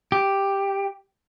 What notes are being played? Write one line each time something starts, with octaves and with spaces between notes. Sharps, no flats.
G4